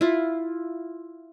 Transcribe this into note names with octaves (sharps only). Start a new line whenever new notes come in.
E4 F4